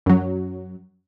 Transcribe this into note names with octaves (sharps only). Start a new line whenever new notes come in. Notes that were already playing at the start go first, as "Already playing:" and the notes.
F#2 F#3